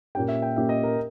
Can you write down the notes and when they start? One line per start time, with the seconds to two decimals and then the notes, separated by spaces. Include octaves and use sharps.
0.15 A#2 A#3 C#4 G4 G5
0.28 E5
0.42 G5
0.56 A#2 A#3 C#4 G4 E5
0.69 D#5
0.83 A#4